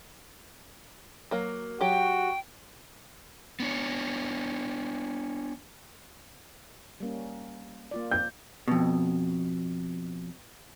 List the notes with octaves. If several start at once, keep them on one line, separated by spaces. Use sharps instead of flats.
F#3 A#3
F#3 F#4 G4 G5
B3 D4 C#5
G3 A#3 C#4
A#3 F4 D5
G6
F2 B2